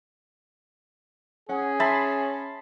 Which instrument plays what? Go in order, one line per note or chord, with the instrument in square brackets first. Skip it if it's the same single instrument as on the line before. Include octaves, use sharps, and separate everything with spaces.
[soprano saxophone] C#4 [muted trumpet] G#4 [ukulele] F#5
[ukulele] E5 [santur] A5 B5 C6